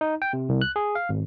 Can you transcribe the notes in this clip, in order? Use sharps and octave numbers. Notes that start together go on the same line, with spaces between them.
D#4
G5
C3
C2
F#6
G#4
F5
G#1